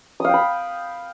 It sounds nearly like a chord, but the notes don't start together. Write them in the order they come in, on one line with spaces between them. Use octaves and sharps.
D#6 F5 G5 B5